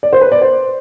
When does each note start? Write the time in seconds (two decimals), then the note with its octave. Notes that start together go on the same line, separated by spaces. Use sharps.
0.03 D5
0.13 C5
0.21 B4
0.32 D5
0.42 C5